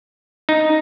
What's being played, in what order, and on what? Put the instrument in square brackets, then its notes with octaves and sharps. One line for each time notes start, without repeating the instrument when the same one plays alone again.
[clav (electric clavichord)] D#4